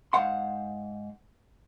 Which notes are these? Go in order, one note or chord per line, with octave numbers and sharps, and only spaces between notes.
G#2 C5 F5 F#5 C6